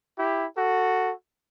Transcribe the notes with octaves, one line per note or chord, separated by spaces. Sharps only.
E4 G4
F#4 A4